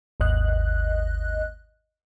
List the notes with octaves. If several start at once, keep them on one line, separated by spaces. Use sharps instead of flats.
G#1 D#2 D#5 F#6